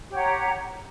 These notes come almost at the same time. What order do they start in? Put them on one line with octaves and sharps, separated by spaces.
G4 C#5 F#5 A#5